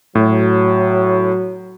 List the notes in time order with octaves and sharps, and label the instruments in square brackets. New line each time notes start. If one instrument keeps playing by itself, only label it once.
[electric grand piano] A2 [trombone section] F#3